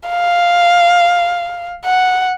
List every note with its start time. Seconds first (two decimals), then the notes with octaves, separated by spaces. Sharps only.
0.09 F5
1.85 F#5